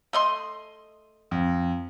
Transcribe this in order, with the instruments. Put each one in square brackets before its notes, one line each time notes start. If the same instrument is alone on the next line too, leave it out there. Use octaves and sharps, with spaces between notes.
[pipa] A3 D#5 C6
[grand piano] F2